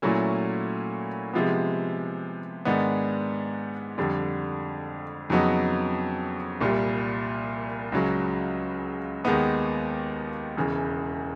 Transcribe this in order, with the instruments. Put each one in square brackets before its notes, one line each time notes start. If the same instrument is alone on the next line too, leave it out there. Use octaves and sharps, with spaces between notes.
[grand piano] A#2 F#3 A3 C#4 E4
C3 F3 G#3 B3
G#2 D#3 G#3 B3 D4
F2 D3 G3
F2 C#3 F#3 B3 D#4
C2 A#2 G3
C#2 C#3 F#3
D#2 D#3 G#3 B3 D#4
E1 E2 C#3 E3